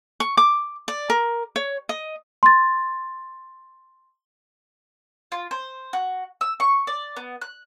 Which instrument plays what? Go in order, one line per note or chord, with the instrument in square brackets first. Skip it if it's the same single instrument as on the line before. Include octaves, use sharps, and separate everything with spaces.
[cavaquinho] C#6
D6
D5
A#4
C#5
D#5
[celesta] C6 A6
[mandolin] F4
C5
F#4
E6
C#6
D5
B3
F#6